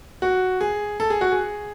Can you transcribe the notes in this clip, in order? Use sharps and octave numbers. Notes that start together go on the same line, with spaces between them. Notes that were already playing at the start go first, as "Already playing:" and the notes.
F#4
G#4
A4
G#4
F#4
G#4